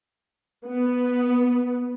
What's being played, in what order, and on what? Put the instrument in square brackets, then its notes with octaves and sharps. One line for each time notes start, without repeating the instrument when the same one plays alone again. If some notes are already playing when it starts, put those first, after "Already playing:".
[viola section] B3